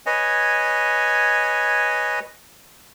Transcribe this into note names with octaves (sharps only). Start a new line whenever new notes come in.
B4 C#5 D#5 G#5